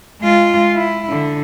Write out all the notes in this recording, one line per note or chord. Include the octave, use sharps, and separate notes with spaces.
G#3 F4
E4
D3